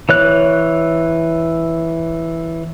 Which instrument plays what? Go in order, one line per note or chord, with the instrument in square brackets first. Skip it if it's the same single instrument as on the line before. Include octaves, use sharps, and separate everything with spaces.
[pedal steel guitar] E3 C#5 F#6